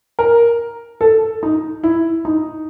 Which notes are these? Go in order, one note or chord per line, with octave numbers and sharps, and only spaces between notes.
A#4
A4
D#4
E4
D#4